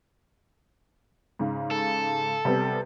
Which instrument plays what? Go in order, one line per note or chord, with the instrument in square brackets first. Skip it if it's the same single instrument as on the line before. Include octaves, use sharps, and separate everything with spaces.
[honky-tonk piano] G#2 C#3
[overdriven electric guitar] A4
[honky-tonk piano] C3 G3 B3